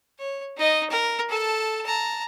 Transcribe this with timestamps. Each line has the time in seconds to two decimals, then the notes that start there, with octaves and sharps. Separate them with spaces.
0.19 C#5
0.57 D#4 D#5
0.90 A#4
1.29 A4 A5
1.86 A5 A#5